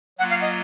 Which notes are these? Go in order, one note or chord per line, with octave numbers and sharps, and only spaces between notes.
F#3 A#3 F4 F#5
F5
D#5